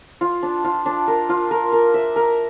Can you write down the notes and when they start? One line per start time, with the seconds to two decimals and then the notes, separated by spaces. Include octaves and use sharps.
0.21 F4
0.43 D4
0.64 F4
0.86 D4
1.08 A#4
1.29 F4
1.51 A#4
1.72 A#4
1.94 E5
2.16 A#4